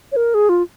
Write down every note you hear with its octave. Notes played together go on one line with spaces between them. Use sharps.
C#5
A#4
G#4
F4